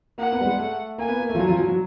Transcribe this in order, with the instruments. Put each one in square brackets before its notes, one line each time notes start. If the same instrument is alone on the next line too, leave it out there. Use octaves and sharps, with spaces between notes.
[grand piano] A#3 [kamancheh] F#5
[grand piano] B3
G3
G#3
A3
[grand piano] A#3 [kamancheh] G#5
[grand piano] B3
A#3
A3
F3
F#3
F3
F#3
F#3